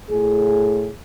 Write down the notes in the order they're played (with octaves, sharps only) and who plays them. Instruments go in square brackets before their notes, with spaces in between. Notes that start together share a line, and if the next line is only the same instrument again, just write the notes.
[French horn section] A2 G#4